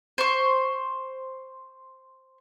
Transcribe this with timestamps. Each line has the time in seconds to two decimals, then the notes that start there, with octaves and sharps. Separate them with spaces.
0.18 C5 C#6